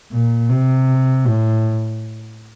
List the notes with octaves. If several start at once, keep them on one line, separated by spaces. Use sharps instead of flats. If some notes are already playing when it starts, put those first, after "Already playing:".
A#2
C3
A2